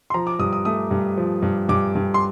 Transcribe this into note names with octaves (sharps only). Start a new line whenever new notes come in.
C6
F3 A#5
D6
G2 D#6
D#6
A3 D#6
G2
F3
G2
G2 D6
G2
C6